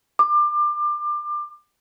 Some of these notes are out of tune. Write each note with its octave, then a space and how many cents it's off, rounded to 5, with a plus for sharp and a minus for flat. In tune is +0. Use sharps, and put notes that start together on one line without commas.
D6 +25